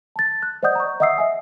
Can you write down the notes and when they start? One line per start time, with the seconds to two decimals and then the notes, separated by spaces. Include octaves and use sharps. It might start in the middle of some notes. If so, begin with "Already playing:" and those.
0.16 A5 A6
0.43 F#6
0.63 C5 D5 D#5 F#5 D#6 G6
0.75 A#5 C#6
1.00 D#5 E5 F#5 D#6 E6 C7
1.18 E5 G#5